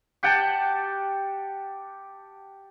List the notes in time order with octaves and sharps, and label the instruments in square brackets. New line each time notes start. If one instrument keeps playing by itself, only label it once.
[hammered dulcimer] G4 F#5 G5 A5